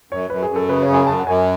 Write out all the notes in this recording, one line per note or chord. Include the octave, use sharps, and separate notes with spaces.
F#2 C#5
F#2 B4
G#4
F#2
A4
C#3 B4
C#5
F#2
G#5
F#2 A5
F#5
F#2 G#5